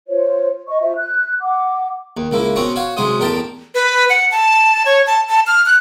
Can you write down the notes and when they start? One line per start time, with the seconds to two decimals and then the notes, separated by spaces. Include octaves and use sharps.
0.08 F4 C5 C#5
0.68 D#5 C#6
0.81 F4 C5 E5
0.97 F#6
1.40 F#5 D6
2.17 D#2
2.31 C#2 A#3 E4
2.56 B2 C4 C#4 A#5 C#6
2.76 F#4 C#5 F5
2.97 B1 C3 G#3 C5 D#6
3.20 A1 E2 G4 A#4 G5 A5
3.75 B4
4.10 F#5
4.31 A5
4.86 C#5
5.07 A5
5.29 A5
5.47 F6
5.66 F#6